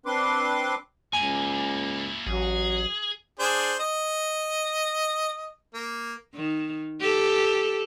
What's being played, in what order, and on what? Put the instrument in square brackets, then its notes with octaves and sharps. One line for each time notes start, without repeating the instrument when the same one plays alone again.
[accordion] C4 D4 B4 C6 D6
[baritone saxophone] C#2 [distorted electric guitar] A#3 E4 [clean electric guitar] G#5
[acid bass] A1 [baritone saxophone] F#3 [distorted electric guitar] G#4
[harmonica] D4 G#4 C5
D#5
A#3
[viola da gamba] D#3
G4 A4